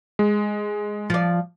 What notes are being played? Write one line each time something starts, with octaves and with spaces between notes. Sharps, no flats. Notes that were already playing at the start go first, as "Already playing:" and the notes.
G#3
F3 D5